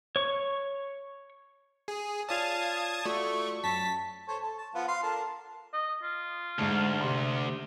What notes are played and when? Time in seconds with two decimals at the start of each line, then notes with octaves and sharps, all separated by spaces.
0.16 C#5 C#6
1.88 G#4
2.29 F4 C#5 D5 F5 A5 D#6 G#6
3.06 A3 F4 F#4 D5 C#6
3.64 F#2 F#3 A5 B6
4.28 A4 C5 C#5
4.43 A4
4.57 A5
4.75 F3 B3 F4
4.88 F5 C6
5.03 D4 A4 A#4
5.73 D#5
6.03 F4
6.59 D2 G#2 A5
7.01 C3 C6